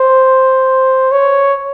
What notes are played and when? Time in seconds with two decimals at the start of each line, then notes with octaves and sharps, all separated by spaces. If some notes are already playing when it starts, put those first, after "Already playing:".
Already playing: C5
1.12 C#5